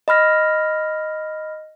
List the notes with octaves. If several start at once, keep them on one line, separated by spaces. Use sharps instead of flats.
D#5 B5 F6 A#6